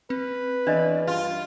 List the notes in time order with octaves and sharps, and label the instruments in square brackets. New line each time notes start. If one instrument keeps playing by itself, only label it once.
[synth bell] C4 [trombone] B4
[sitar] E2 [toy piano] D4 D#5 B5
[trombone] G2 [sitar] F4